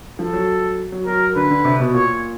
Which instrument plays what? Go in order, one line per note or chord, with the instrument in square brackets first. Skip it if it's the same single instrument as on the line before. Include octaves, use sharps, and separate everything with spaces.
[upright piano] F3 [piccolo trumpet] A4
[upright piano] F#3
F#3
[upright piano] F#3 [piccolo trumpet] A#4
[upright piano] D3 [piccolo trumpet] B4
[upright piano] D3
C3
B2
[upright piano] A#2 [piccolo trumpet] C#5